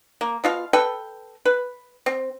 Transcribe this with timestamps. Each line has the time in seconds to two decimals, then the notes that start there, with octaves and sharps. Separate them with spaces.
0.21 A#3
0.44 B2 F4 F5
0.73 A4 B4 G5
1.45 B4
2.06 C4